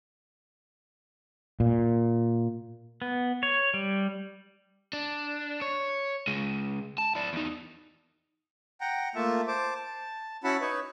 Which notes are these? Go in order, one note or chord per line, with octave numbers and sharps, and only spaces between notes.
A#2
B3
C#5
G3
D4
C#5
C#3 G#3
A5
E4 D5
E2 D#4
F#5 G5 A#5
A3 A#3 F4 E5 A5
C5 A5 D6
A5
C#4 E4 F#4 F#5 A5 B5
D#4 B4 C#5